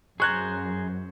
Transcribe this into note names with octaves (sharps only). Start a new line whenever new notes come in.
F#2 G#4 C5 A#5 C#6 F#6 G#6